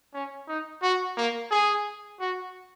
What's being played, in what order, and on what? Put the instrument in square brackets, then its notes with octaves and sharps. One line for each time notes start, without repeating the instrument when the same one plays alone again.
[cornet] C#4
D#4
F#4
A#3
G#4
F#4